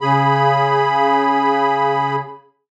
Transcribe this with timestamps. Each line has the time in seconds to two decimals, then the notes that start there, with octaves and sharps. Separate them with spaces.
0.01 C#3 G#4 B5